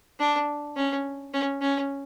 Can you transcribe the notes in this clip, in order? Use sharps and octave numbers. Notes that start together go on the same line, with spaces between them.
D4
C#4
C#4
C#4